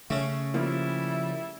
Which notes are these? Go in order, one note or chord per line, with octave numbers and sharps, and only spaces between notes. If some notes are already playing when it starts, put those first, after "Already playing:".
C#3 A3 C#4
F3 G3 A#3 E4